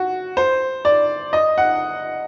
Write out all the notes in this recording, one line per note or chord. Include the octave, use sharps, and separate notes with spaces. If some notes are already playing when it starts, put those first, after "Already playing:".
Already playing: F#4
C5
D5
D#5
F#5